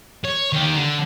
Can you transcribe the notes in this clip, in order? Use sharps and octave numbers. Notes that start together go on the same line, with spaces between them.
C#5
D#3 G4
D3